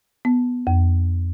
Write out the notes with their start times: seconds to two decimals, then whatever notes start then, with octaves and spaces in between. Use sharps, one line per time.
0.25 B3
0.67 F2